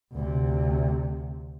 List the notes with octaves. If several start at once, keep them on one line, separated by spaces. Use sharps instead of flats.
D2 C3